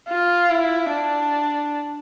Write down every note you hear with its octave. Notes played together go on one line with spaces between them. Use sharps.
F4
E4
D4